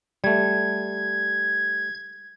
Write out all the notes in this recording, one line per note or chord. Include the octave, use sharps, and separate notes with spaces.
G3 A3 G#6